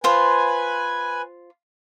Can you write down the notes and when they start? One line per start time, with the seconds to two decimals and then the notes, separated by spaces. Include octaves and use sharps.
0.04 F4 B4 C5 F5 G#5